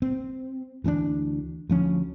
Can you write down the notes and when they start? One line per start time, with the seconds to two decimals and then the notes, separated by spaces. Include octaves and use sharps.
0.02 C4
0.84 D2 E3 C#4 D4
1.70 D2 F3 C#4